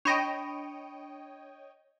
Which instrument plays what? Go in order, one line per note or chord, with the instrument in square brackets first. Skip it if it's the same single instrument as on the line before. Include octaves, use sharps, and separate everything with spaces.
[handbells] D4 B5 A#6 [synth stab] C#5 D#5 G5